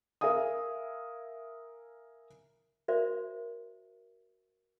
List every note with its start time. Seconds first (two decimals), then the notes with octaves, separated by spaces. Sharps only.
0.21 A#4 E5 F5 G#5 D#6
2.88 F#4 A#4 C5 D5 E5